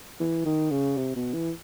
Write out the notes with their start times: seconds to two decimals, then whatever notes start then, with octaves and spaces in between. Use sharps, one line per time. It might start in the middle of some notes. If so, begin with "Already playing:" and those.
0.20 E3
0.45 D#3
0.71 C#3
0.97 C3
1.16 B2
1.34 E3